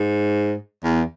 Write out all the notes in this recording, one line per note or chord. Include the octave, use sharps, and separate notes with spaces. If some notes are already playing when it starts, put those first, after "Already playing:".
Already playing: G#2
E2